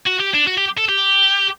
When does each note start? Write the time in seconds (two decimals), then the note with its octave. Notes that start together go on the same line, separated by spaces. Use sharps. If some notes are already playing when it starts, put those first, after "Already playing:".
0.06 F#4
0.20 G4
0.34 D4
0.47 F#4
0.58 G4
0.78 A4
0.89 G4